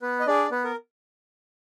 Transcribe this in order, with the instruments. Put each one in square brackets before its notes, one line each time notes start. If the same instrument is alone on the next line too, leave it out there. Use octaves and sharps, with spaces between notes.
[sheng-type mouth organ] B3 B4
D#5
D4 G#4 D5
B3 B4
A#4